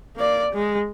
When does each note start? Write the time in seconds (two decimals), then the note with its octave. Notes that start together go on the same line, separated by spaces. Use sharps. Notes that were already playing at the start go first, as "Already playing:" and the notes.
0.16 A#3 D5
0.53 G#3